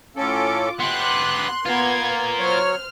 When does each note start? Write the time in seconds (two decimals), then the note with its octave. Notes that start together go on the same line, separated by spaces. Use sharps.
0.16 A2 C#4 F4 A4 D6
0.80 B3 G4 C6 F#6
1.66 B3 F4 A#4 G#6
2.39 F#3 C5 C#5 F6